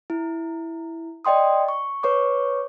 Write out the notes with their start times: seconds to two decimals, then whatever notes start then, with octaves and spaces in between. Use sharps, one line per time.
0.10 E4
1.25 D5 D#5 G5 C6 D#6
1.68 C#6
2.03 B4 C#5 C#6 D6